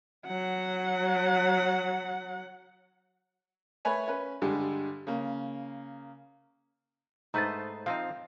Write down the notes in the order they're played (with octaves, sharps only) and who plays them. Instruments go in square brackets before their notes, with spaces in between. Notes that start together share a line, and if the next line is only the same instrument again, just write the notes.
[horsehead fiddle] F#3 F#5
[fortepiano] A3 B4 C#5 G#5 B5
C#4 B4
G2 D3 G3 G#3
C#3 A#3
[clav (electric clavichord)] G#2 A3 B4 [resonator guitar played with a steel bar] D#4 C5 [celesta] A#5 G6 A6
[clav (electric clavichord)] F3 C4 D#4 [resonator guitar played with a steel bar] F5